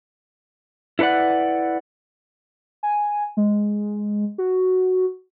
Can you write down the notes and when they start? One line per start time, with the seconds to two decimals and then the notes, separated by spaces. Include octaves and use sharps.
0.99 E4 A4 B4 D5 F#5
2.83 G#5
3.37 G#3
4.38 F#4